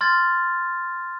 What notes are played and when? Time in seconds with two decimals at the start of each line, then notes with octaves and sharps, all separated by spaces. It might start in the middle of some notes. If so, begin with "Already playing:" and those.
0.01 C6 F6 G#6 A6